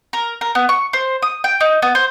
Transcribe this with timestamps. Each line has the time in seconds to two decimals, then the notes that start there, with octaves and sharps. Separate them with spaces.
0.13 A#4
0.41 A#4
0.55 B3
0.69 C#6
0.93 C5
1.22 D#6
1.44 G5
1.61 D#4
1.82 B3
1.95 C5